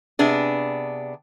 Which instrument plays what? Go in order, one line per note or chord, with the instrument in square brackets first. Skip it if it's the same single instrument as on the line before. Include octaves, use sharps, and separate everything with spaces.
[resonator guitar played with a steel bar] C3 B3 D4 G#4